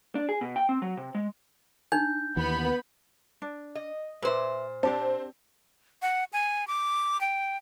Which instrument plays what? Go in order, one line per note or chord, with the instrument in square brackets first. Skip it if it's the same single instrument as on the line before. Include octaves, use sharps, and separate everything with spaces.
[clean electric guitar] D4
G#4
B2
G5
C4
F#3
C3
G#3
[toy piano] D4 D#4 [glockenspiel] G6
[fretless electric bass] D#2 E3 [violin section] B3 B5
[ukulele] D4
[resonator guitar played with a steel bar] D#5
[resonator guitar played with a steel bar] A#2 C5 [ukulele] B4 E5
[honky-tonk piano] C4 [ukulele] D4 G4 A5
[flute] F#5
G#5
D6
G5